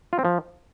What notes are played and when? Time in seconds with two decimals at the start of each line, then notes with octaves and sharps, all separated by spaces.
0.13 F4
0.19 C4
0.25 F3